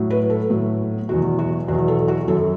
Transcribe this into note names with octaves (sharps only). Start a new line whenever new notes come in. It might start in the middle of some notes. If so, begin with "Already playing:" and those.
Already playing: A2 F#3
B4
A4
A2 F#3
E2 B2 F#3 F#4
F#4
E2 B2 F#3 F#4
A4
F#4
F#2 F#3 A4